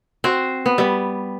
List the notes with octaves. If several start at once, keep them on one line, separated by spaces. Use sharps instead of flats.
C4 F#4 C5
B3
G3 B3